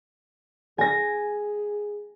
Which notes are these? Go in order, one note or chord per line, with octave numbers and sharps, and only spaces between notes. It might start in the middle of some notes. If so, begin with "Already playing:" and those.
G#4 G#5 A#6